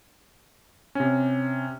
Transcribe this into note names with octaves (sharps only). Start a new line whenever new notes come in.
C3 C#4